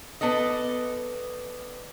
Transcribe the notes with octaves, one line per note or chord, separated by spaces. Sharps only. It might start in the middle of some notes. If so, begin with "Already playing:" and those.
B3 A4 D5 D#5